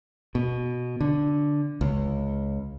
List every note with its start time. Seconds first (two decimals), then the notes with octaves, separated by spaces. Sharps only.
0.35 B2
1.01 D3
1.81 C#2